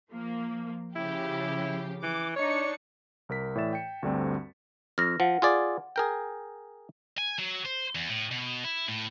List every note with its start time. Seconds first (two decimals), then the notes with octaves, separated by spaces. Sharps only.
0.12 F3 A#3
0.96 C#3 F3 E4 G4
2.03 E3 D6
2.36 D4 D#4 C#5 C#7
3.29 C2 A#4 B6
3.55 A2 E3 D5 E5 A6 E7
3.73 G5 C#7
4.03 D2 G2 D3 G3 C4
4.98 F2 F6 A#6
5.20 F3 F#5
5.42 F4 G#4 D5
5.96 G#4 A#4 G5
7.18 G#5
7.39 F#3
7.66 C5
7.95 E2
8.09 A2
8.31 B2
8.64 E4
8.88 A2